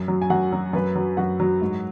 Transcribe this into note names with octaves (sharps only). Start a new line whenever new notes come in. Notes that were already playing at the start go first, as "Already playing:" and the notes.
Already playing: F#2
F#3
G#5
F#2 F#4 F#5
F#3
F#2 B4
F#3
F#2 F#4 F#5
F#3
G#2